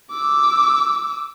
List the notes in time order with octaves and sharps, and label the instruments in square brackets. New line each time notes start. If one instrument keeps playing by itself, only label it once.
[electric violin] D6 E6